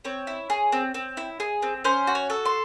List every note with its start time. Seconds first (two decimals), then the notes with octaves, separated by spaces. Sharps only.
0.05 C4 C#5
0.27 E4
0.50 G#4
0.72 C4
0.94 C4
1.17 E4
1.40 G#4
1.62 C4
1.84 C#4 C5
2.07 F#4
2.15 C#5
2.30 A4
2.45 C6